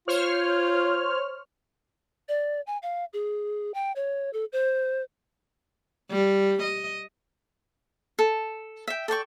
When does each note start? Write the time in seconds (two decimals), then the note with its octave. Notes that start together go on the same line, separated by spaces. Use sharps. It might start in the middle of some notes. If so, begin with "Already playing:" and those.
0.08 F4 C5 C#5 F6
2.28 D5
2.67 G#5
2.83 F5
3.13 G#4
3.74 G5
3.96 C#5
4.33 A4
4.53 C5
6.11 G3
6.63 D#5
8.19 A4
8.87 E5 G5
9.08 A4 D5 G5 C#6